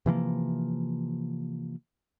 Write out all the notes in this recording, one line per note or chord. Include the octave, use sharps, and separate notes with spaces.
C3 E3 F3 A#3